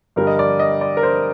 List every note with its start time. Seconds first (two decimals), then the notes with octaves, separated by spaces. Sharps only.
0.16 G2 D3 G3 A#4
0.27 D#5
0.39 D5
0.59 D#5
0.81 D5
0.97 A#4
1.03 C5